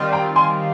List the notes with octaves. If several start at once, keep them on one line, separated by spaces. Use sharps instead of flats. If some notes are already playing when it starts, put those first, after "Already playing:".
Already playing: D#3 G3 C4 F4
G5 A#5
G#5 C6